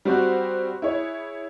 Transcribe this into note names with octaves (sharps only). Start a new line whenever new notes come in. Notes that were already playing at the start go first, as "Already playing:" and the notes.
G3 C4 F#4 C5 F#6
E4 G#4 C#5